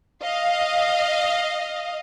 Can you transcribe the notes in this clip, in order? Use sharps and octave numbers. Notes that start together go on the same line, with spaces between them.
D#5 F5